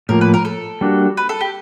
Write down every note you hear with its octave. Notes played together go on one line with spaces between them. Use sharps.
A2 F3 A#3 A#4
B4
A#4
A4
G3 A#3 D4 F#4
B4
A4
G4